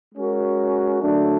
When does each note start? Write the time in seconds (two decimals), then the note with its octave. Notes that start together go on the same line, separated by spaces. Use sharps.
0.15 G#3 C#4 F#4 A#4
1.00 D3 F#3 A3 D4